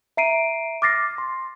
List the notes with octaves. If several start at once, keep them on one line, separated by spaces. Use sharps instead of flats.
E5 A#5 C7 D7 D#7
D6 F6 A6 A#6 C7
C6